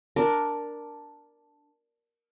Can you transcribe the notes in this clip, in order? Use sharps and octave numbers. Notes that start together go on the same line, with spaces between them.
D4 A#4